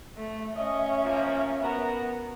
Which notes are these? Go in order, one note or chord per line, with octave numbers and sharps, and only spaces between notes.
A3 E5
C#4 D#5
F3 A#3
B3 F#4 A#4 A#5